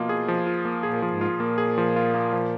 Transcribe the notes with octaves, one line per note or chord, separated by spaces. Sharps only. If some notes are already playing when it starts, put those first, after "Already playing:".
Already playing: B2 F3 A#3 F4
G#4
F3
F4
A#3
A#2 G#4
A#2 F3
G#2
F4
A#2
A#3
G#4
F3
F4
A#3
F3